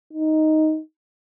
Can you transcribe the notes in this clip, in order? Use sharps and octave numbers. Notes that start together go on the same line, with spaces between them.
D#4